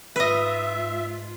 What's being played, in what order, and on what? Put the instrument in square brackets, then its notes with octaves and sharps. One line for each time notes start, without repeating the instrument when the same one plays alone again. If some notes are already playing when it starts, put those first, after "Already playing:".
[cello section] G#2 F4 [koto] B4 D#5 [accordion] E5